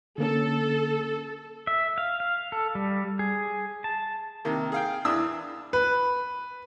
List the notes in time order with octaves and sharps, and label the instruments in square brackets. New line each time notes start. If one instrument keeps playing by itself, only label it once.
[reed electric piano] D3 A#3 C#4 [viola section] A4
[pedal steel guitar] E5
F5
F5
A4
G3
G#4
A5
[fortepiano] C3 D#3 A#3
G#4 F5 G5
E2 E3 D4 D#6 E6
[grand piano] B4